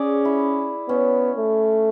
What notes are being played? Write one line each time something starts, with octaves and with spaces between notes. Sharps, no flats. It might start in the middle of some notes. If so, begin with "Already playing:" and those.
Already playing: C#4 G#4 D5
E4
B3 C#4
A3